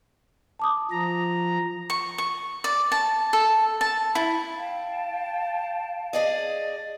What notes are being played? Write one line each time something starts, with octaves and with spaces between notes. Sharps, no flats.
A5 D6 D#6
F3 A#5
C#6
C#6
D5
A5
A4
A5
E4
F5 G5 A5
G#4 D5 D#5